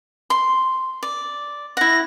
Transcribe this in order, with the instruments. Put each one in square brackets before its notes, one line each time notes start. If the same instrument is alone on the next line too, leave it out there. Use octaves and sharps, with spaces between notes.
[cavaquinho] C6
D5
[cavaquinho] E4 F#5 [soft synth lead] A#6